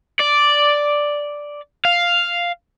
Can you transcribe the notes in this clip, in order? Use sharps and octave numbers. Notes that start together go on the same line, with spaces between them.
D5
F5